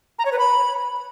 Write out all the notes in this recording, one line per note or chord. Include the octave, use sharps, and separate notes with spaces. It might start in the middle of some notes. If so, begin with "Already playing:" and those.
A#5
C#5
B4
B5